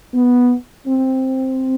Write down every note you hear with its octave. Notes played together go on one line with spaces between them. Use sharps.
B3
C4